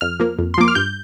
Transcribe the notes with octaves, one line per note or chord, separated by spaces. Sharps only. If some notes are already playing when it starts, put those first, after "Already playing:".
F2 F6
F3 A#3
F2
C6
F3 A#3 D6
F6
G2 G6